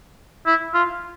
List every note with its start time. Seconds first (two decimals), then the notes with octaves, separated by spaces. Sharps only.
0.46 E4
0.74 F4